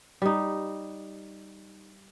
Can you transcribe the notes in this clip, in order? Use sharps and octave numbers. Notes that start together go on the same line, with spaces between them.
G3 D#4